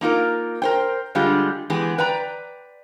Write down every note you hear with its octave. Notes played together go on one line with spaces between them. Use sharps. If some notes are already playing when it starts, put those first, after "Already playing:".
A#3 D#4 F4 A#4
A#4 C5 G5
D3 G3 G#3 F4 G4
E3 G#3 B3 G4 G#4
B4 D5 G5 A#5